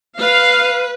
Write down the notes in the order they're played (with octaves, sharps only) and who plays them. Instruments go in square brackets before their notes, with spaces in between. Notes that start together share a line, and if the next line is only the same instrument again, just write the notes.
[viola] B4 [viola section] F5